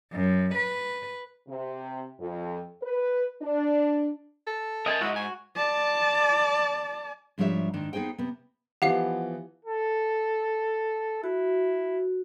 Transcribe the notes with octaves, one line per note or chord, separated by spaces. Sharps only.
F#2
B4
C3
F2
B4
D4
A4
A#4 D#5 E5 G#5 A5
G#2 E4 F#4 D#5
F#4 G#5
D5 A5
G#2 F3 G3 D4 C#5 E5
G#2 D#3 D4
B3 D#4 G#4 C5 G5
C3 B3
E3 F3 B3 G4 F5 F#5 C7
A4
E4 F#4